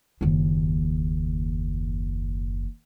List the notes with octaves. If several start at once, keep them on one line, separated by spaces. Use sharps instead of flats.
F#1 D#2